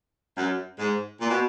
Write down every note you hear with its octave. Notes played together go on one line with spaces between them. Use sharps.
F#2
G#2
A#2
B2